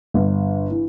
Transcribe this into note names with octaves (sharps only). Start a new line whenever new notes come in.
G1
E3